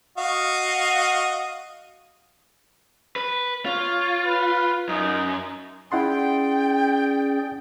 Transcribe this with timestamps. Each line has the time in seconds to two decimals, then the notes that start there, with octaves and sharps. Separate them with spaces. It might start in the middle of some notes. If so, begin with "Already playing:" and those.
0.18 F#4 D#5 F5
3.16 B4
3.66 F4 C#5
4.25 B4
4.89 F#2 D#4
5.92 C#4 E4 G#4 D5 F#5 G5 C6